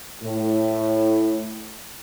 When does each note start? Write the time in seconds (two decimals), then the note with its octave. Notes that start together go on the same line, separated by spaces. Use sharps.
0.23 A2